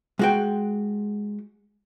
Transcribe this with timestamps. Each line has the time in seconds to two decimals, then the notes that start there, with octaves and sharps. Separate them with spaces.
0.19 G#3 F#4 G5